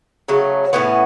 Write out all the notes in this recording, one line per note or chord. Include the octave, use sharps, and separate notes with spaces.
C#3 F#3 A3
A2 E3 B3 C#4